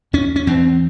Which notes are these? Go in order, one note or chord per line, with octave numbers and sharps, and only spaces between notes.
E2 C#4
C#4
E2 C4